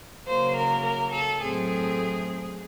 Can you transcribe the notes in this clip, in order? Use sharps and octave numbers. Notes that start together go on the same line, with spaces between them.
C#3 F#3 A#3 C5
A#4
A#4
A4
A2 F#3 A3 C4 G#4